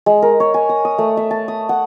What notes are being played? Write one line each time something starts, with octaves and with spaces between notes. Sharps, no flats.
G#3
A#4
C#5
G#5
D#6
D#6
A3
E5
A5
D#6
F#5